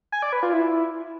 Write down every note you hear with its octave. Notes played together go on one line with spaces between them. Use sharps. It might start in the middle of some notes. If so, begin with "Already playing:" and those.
G#5
D5
B4
F4
E4